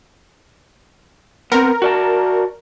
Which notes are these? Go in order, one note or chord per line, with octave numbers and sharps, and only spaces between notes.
B3 C4 A#4
F#4 D5 A5